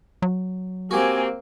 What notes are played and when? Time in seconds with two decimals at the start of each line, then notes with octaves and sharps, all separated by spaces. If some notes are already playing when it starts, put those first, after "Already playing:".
0.22 F#3
0.91 A#3 C4 F#4 G4 G#5